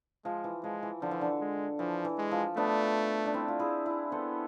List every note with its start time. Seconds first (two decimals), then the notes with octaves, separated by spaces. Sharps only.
0.25 F3 G#3
0.44 E3
0.63 F3 G#3
0.83 E3
1.02 D3 F3
1.11 E3
1.21 D3
1.41 G#3
1.79 E3 F3
2.05 E3
2.18 G#3
2.31 F3
2.57 A3 B3 D4
3.26 D4
3.34 C4 E4
3.48 F4
3.59 E4 G#4
3.86 E4 G#4
4.12 B3 A4 C5